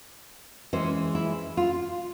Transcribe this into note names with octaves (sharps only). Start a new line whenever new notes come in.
E3 G#3 C#4 C5
E4
F4